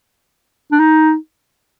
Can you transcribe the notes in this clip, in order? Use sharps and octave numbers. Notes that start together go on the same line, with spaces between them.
D4
D#4